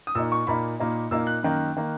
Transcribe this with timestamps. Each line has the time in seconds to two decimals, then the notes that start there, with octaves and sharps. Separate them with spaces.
0.07 D#6
0.15 A#2 A#3 D#4 E6
0.32 C#6
0.47 A#2 A#3 D#4 B5
0.80 A#2 A#3 D#4
1.11 A#2 A#3 D#4 E6
1.27 F#6
1.43 F#2 D#3 A#3
1.77 D#3 A#3